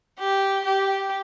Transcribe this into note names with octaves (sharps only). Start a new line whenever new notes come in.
G4
G4